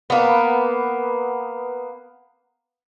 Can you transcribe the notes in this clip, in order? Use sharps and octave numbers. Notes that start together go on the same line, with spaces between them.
A#3 B3